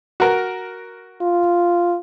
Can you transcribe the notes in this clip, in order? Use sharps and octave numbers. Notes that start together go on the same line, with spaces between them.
F#4 A#4
F4